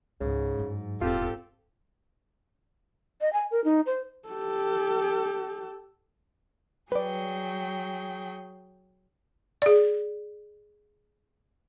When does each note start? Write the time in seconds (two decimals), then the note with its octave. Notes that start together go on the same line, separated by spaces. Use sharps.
0.20 C#2 G#2 C#3
0.59 G2 F#3
1.01 D#1 E2 C4 F4 G4 A4
3.21 D#5
3.33 G#5
3.51 A#4
3.64 D#4
3.86 C5
4.28 G4 A4
6.92 F#3 G#4 B4 D5 G5
9.62 G#4 D5